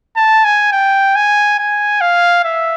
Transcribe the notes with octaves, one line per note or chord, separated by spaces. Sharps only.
A5
G#5
G5
G#5
G#5
F5
E5